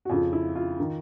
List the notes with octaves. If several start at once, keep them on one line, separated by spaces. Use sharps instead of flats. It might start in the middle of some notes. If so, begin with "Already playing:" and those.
F#4
F2 C#3 F3 F4
E4
F4
D#3